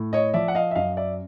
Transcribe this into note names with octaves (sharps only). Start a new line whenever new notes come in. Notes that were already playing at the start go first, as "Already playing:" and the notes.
Already playing: A2
C#5 D#5
F3 D5 E5
F#5
D#5 F5
E5
F#2 D#5 F5
D5 E5